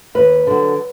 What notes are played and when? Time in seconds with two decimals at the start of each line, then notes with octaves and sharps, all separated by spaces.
0.15 D#2 B4
0.47 D3 F#3